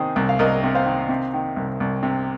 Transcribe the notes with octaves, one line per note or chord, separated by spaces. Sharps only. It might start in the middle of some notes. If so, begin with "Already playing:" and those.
Already playing: C3 D#3 G#4 C5
C2
F5
C2 A#4 D#5
C3
C5 F5
D#3
C3
D#3
C2
C2
C3